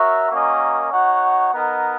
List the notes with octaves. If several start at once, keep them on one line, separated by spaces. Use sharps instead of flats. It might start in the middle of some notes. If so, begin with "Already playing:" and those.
Already playing: F#4 A#4 C#5 E5
A#3 C#4 F#4 A#4 D#5
D#4 F#4 C#5 F#5
B3 D#4 A#4 D#5 F#5